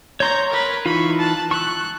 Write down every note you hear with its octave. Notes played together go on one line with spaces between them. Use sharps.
C#5 A#5 C6 C#6 G6
A#4 B4
E3 D#4 F4 B5 C#6
A5 F#6
C#6 E6 F#6